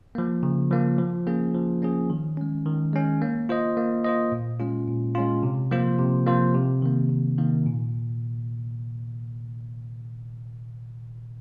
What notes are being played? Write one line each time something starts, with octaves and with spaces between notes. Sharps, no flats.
F3 A#3
C#3
F3 A#3
F3
A#3 C#4 G#4
F3
A#3 C#4 G#4
D#3
G#3 C#4
D#3
G#3 C#4
A#3
F4 C5 D#5
A#3
F4 C5 D#5
A#2
G#3 C#4 F4
A#2
G#3 C#4 F4
C3
F3 A#3 F4 C5
C3
F3 A#3 F4 C5
C3
D#3 A#3
C3
D#3 A#3
A#2